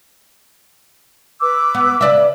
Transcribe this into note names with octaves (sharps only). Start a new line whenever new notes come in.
B4 D6 E6
B3
C#3 D5 E5